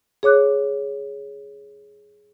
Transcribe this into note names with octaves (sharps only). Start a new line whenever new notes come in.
G#4 C#5 D6 F#6